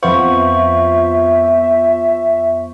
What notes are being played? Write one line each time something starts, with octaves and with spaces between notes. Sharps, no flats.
F2 B3 F4 C5 E5 C#6